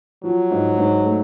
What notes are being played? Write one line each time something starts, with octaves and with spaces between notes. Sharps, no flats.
F3 F#3
G#2
G#2
A3